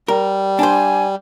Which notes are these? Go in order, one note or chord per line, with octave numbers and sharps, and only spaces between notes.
G3 A#4
D4 C5 G#5